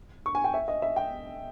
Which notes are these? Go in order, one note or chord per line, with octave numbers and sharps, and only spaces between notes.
C#6
G#5
G5
E5
D#5
E5
G5